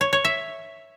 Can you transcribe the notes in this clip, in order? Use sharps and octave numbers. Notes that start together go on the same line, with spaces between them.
C#5
C#5
E5